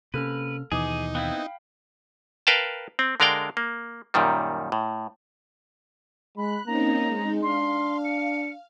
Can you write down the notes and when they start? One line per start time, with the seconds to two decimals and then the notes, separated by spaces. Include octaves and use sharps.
0.14 C3 A#3 C#4 A4 B4 F6
0.72 D#2 B2 E3 D#4 G#4 G#5 D6 D#6
1.15 B3 C4 E4 F5 G5 B5
2.47 A#4 B4 F5 G5 A5
2.99 C4
3.20 D3 G#3 A#4 D5 F5 G5
3.57 A#3
4.14 F#2 A#2 D#3 G3
4.72 A2
6.37 G#3 B5 F#6
6.66 A#3 C4 C#4 D#4 A#5
7.07 G#3 D#4
7.43 D4 F5 C6
8.05 C#7